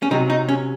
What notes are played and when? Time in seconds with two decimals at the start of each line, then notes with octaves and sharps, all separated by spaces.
0.02 C#4
0.11 C3 F#3 D#4
0.30 D#4
0.49 C#4